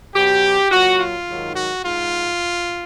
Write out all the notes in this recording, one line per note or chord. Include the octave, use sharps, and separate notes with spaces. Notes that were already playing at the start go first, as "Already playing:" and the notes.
B2 F#3 G4
A#2 F#3 F#4
F4
G#2 D#3 F#3
F#4
G#2 F4